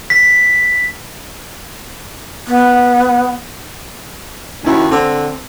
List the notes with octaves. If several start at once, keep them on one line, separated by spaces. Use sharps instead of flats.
B6
B3
D#2 C#4 E4 F#4
D3 C4